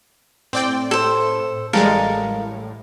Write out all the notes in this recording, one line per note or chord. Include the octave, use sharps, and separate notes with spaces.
A2 C4 D5 G5
A4 C5
A1 A2 G3 G#3 A4 A#4 F5